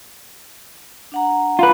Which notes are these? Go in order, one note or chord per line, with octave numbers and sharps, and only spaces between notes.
D4 F#5 A#5
F4 B4